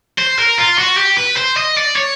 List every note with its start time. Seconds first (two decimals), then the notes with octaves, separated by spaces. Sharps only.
0.18 C5
0.39 A#4
0.58 F4
0.78 F#4
0.97 G4
1.17 B4
1.36 C5
1.57 D#5
1.77 D5
1.96 C#5